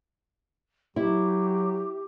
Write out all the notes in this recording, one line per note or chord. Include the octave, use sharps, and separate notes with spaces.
F#3 E4 G4